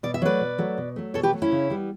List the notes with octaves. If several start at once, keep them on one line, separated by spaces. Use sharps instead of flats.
B2 D5
E5
F#3 A3 B4 D5
B2
F#3 A3
B2
F#3 A3
B2 A4 C#5
G4 B4
F#3 A3
C#4 E4
C#3
G3 B3